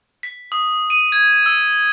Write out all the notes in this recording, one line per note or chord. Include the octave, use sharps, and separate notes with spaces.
B6
D#6
D#7
G#6
E6